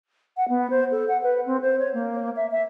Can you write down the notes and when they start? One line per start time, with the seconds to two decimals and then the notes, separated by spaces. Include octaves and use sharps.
0.37 F#5
0.49 B3
0.70 C5
0.91 A4
1.08 F#5
1.23 B4
1.46 C4
1.61 C5
1.79 C#5
1.94 A#3
2.36 E5
2.51 E5